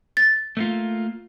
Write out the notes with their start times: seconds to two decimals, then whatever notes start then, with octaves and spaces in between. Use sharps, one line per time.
0.17 A6
0.57 A3 A#3 F4